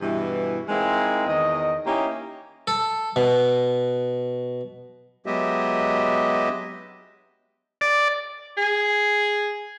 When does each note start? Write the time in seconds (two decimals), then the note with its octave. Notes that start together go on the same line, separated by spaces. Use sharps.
0.01 G2 B2 E3
0.69 G#3 A#3 C4 D#4 E4
1.27 E2 D#3 D#5
1.86 A#3 C#4 D#4 E4 G4
2.67 A4
3.16 B2
5.26 F#3 G#3 B3 G4 D#5 E5
7.81 D5
8.57 G#4